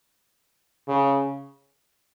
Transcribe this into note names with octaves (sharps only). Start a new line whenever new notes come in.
C#3